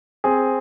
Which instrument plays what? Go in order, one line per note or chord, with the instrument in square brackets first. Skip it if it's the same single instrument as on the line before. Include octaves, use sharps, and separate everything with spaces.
[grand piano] C4 G#4 G#5